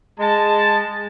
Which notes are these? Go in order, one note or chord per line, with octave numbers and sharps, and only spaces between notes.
G#3 A5